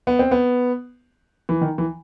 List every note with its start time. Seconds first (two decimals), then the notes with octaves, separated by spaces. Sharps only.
0.07 B3
0.19 C4
0.31 B3
1.49 E3
1.61 D#3
1.78 E3